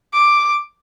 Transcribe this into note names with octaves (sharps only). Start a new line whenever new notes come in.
D6